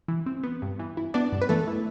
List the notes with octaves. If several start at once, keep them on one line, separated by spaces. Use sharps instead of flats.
E3
C4
B3
G2
E3
E4
B3 D4 D5
G2
B4
E3 A3 A4
E4